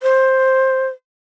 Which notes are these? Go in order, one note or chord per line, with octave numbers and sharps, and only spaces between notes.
C5